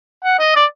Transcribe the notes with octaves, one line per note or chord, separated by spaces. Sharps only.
F#5
D#5
D5